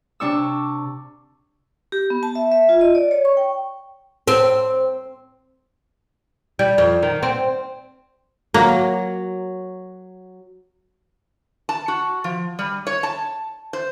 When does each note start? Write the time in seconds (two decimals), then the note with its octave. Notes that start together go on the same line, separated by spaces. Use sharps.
0.20 C3 D4 C#6 E6
1.92 G4
2.10 B3
2.23 A5
2.35 E5
2.52 E5
2.69 F4
2.81 D#5
2.95 D5
3.11 C#5
3.25 C#6
3.37 G5
4.28 C4
6.59 G3
6.78 F2
7.03 D#3
7.23 C4
8.54 F#3 A#3
11.69 A5
11.88 F#4
12.24 F3
12.59 G3
12.87 C#5
13.03 A5
13.73 C5